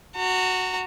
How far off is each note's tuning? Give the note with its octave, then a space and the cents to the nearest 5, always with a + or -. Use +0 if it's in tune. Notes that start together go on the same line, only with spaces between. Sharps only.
F#4 +0 A#5 -35